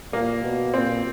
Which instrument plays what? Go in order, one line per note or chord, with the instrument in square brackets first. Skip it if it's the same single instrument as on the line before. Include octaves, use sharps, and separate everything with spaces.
[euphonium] A#2 [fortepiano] A#3
[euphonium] B2
[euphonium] A#2 [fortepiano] C4